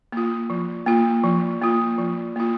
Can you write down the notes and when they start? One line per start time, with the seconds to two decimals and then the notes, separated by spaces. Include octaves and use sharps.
0.12 A#3 F4
0.50 F3
0.86 A#3 F4
1.24 F3
1.62 A#3 F4
1.98 F3
2.36 A#3 F4